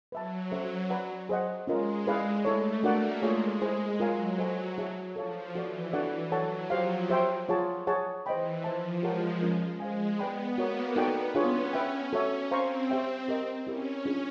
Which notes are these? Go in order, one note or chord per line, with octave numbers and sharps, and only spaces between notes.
F#3 B4 E5 A5
F#3 C#4 F#4 A4 C5 E5
B4 D5 F#5 A#5
G#4 C5 D#5 F#5
G#3 C#4 F4 A#4 D#5
E4 G#4 B4 D5 F5
A3 E4 A4 C#5
A#3 D4 F#4 A#4 D5 F#5
G#3 F4 G#4 C#5
E4 G#4 C5
F#3 F4 A#4 C#5 F5 G#5
A4 C5 D#5 G#5
E4 G#4 C#5 E5 A5
F3 A4 C#5 F5 A5
E3 F#4 A4 D5
E3 D4 F#4 A4 D5 F#5
F#3 A4 C#5 F#5 A5
F3 G4 C5 F5
G4 C5 E5 G5 C6
F4 G#4 C#5 F#5 A5
G#4 C#5 F#5 A5
E3 C5 D#5 G5 B5
F3 C5 E5 A5
G#3 G4 A#4 C#5 F#5 A5
C#4 F4 A#4
G#3 C5 F5 G#5
B3 B4 D5 G5 B5
A#3 F#4 A#4 C#5
B3 D#4 F#4 A4 D5 G5
C#4 D4 F4 G#4 C#5
C#4 B4 E5 G5
F#4 A4 C#5 E5
C4 C5 F5 A#5 C#6
C4 G4 C5 E5 G5
G4 A#4 D#5
C#4 E4 G4 A#4
D4 F4 G#4